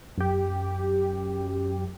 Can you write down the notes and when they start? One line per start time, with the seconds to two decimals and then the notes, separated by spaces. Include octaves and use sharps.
0.18 F#2 G4